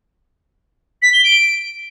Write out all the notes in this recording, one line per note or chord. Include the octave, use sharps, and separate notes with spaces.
B6
G7
D7